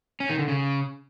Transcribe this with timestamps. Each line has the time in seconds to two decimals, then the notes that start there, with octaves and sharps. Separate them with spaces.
0.20 C#4
0.30 D#3
0.39 D3
0.48 C#3